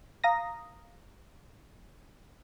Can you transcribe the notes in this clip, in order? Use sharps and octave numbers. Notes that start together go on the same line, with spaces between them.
F5 A#5 D#6 A#6